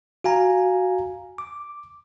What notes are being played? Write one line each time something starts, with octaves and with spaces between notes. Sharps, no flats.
F#4 F5 G#5 A#5
D6